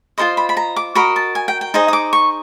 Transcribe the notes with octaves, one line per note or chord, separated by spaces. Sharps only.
F4 A4 C5 D#5 C6
B5
B5
A#5
D6
F#4 A#4 D#5 B5
A5
G#5
G5
G5
D#4 G#4 C5 D#5
D#6
D6
C#6